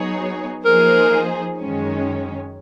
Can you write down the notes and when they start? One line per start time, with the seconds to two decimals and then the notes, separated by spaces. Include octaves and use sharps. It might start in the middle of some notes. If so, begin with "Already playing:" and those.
Already playing: F#3 B3 D#4 G#4 C#5
0.65 F3 A#3 D#4 G#4 A#4 C5
1.58 F#2 D#3 G#3 C#4